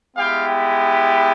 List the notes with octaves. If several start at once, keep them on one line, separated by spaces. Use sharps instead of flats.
G#3 B3 E4 G4 F5 G5